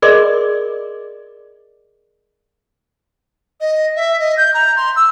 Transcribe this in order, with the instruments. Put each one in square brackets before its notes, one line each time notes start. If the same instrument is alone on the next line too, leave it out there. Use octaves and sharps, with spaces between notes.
[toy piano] G#4 A#4 D5 D#5 C6 D6
[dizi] D#5
E5
D#5
G6
A#5
C6
E6